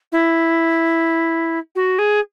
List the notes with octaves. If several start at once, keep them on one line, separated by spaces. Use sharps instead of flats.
E4
F#4
G#4